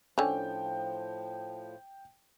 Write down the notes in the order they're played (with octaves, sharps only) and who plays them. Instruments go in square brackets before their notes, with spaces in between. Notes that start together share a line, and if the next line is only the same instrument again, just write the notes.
[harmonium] A2 F3 [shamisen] D3 C#4 [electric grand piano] G5